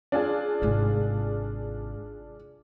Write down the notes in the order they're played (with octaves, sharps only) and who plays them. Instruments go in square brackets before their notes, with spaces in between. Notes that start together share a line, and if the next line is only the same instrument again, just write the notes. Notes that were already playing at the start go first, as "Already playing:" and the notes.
[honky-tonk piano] D4 F4 G#4
[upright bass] G#1 C3